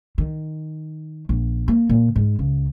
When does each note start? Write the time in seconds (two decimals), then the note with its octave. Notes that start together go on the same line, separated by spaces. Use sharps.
0.18 D#3
1.29 A#1
1.68 A#3
1.89 A#2
2.16 G#2
2.39 C#2